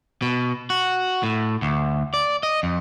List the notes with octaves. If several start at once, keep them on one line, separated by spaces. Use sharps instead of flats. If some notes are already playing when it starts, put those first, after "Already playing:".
B2
F#4
A2
D2
D5
D#5
F2